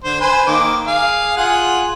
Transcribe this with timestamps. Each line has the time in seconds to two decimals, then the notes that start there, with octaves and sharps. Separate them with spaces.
0.04 D3 C5
0.21 B4 C5 G#5
0.47 D#3 A#3 D6
0.87 G#4 F5
1.37 F4 G#4 F#5